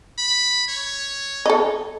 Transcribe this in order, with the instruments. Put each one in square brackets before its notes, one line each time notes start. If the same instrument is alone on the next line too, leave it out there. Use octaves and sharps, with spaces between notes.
[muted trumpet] B5
C#5
[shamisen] A4 D#5